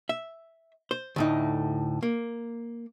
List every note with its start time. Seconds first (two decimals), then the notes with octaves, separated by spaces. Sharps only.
0.09 E5
0.91 C5
1.16 D2 A2 D#4
2.03 A#3